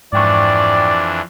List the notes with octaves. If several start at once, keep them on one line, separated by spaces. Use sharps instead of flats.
F2 G#2 E3 D4 D5 G5 C#6